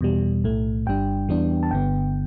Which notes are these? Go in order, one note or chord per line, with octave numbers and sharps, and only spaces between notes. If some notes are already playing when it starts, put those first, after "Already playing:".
E2 B2 G3
B1 A2 A3
G1 G2 G3 D4 G5
E2 E3 G3 B3 D4
A5
G1 G2 D3 B3 G5